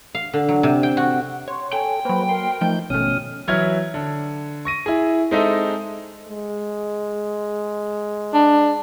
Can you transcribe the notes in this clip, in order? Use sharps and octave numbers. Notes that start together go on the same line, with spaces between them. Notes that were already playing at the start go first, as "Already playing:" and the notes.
F5
D3
F#3
C3
G5
F#4
C#5 C6
A4 G5 G#5
F#3 A#3 B4 C5 B5
A#4 C6
F3 A3 D#4 F4 G6
G#1 B2 A3 C#4 D#6 F6
E3 F#3 E4 C#5 F6 G#6
D3
C#6 A#6 D#7
E4 G#4
G#3 C4 D#4 A4 D#5 E5
G#3
D4